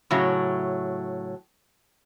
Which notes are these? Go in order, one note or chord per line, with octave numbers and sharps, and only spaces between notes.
A2 C#3 F#3